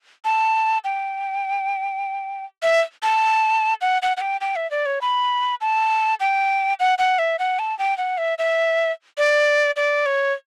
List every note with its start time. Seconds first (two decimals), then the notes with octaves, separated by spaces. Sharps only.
0.25 A5
0.84 G5
2.63 E5
3.03 A5
3.81 F#5
4.02 F#5
4.17 F#5
4.21 G5
4.41 G5
4.56 E5
4.71 D5
4.86 C#5
5.01 B5
5.61 A5
6.20 G5
6.80 F#5
6.99 F#5
7.19 E5
7.39 F#5
7.59 A5
7.79 G5
7.98 F#5
8.18 E5
8.38 E5
9.18 D5
9.76 D5
10.06 C#5